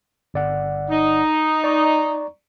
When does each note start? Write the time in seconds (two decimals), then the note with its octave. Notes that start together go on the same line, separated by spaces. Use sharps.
0.34 G1 D5 F#5
0.90 D#4
1.64 D5 A#5 C#6